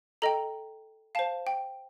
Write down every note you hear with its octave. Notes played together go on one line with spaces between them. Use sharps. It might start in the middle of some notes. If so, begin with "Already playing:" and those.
A4 D#5 G5 A#5
C5 F5 A5
G5